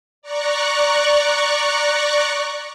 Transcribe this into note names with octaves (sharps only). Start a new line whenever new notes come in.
D5 A#5 C#6 F#6